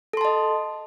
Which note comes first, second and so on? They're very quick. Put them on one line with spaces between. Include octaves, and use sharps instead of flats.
A4 C6 A5 D#5